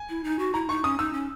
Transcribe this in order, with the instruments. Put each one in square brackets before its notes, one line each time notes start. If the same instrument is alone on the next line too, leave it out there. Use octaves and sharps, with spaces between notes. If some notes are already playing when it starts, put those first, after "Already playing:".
Already playing: [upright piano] G#5
[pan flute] E4
D#4
F#4
[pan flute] E4 [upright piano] A#5
[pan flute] D#4 [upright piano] C#6
[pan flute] C#4 [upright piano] D#6
[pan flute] D#4 [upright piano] E6
[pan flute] C#4